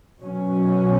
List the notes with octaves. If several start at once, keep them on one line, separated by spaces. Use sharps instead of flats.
B2 F#3 C#4